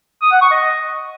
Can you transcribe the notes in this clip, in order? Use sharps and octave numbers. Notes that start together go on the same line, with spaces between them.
D#6
F#5
C#6
D#5